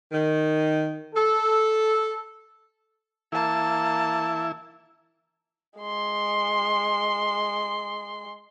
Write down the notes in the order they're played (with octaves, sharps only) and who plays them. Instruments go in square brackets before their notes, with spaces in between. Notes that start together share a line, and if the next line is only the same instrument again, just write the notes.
[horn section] D#3
A4
[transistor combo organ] E3 E4 [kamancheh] A#3 A5
[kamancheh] G#3 C6